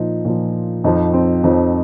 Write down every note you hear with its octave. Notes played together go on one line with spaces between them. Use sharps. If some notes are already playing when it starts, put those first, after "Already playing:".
Already playing: A#2 F3 D#4
A#2 F3
F2 F3 D#4
C4
F2 F3 D#4